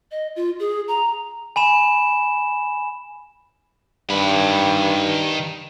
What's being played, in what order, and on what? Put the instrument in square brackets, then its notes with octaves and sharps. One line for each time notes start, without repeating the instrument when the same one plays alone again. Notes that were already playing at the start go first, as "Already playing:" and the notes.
[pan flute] D#5
F4
G#4
A#5
[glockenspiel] G#5 B5 E7
[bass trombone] G2 [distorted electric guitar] D#3 B5